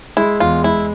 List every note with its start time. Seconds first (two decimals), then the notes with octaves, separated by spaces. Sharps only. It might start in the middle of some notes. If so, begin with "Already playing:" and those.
0.17 G#3 E4
0.40 E2 F4
0.64 G#3 E4